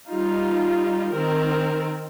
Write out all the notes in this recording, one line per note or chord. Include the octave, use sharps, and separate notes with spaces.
G3 D#4 F4
D#3 C4 A#4